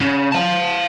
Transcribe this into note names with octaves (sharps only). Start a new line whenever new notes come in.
C#3
F5 A5